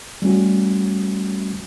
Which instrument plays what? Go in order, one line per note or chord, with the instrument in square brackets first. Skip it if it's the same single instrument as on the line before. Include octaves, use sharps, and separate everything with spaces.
[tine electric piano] G3 A3 C#4 F#4